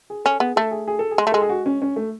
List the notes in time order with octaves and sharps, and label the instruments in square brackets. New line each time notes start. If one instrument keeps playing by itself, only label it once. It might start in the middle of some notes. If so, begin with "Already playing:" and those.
[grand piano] G#4
[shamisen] C#4 [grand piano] A4
[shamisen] B3 [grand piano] G#4
[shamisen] A3 [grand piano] A4
[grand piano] G#4
G#4
A4
G#4
[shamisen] G#3
A3
[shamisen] G#3 [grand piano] A4
[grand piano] G#4
F#4
C#4
C#4
A3